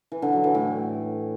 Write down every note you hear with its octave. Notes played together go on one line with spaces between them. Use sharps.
E3
D3
F#3
E3
A2